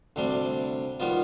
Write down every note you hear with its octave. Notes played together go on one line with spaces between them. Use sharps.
D2 C3 G3 D4
D#3 G3 B3 F4